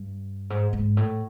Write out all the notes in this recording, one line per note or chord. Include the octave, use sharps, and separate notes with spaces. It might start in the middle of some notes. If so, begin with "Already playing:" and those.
Already playing: G2
G#2
G#2
A2